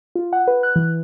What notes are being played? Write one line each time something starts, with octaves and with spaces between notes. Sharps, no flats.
F4
F#5
B4
F#6
E3